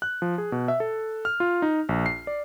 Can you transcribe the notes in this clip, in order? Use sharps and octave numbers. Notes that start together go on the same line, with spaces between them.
F#6
F3
G#4
B2
E5
A4
F6
F4
D#4
A#1
C7
D5